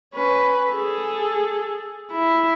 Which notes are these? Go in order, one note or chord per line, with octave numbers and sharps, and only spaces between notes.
C#4 B4
G#4 A4
E4